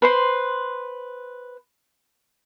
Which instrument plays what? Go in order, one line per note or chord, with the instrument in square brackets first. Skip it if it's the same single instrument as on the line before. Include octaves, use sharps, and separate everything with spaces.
[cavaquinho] B4 C5 C6